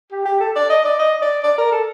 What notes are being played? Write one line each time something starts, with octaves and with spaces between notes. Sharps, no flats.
G4
G4
A4
D5
D#5
D5
D#5
D5
D5
A#4
A4